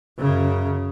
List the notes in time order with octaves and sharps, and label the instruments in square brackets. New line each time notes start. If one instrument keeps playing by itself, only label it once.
[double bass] F#2 C#3